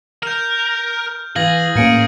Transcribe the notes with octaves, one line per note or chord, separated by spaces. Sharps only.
A#4 F6 G6
E3 G#4 F5 G#6 A#6 F#7
A2 A#3 C#4 F5 G#6 C#7 D7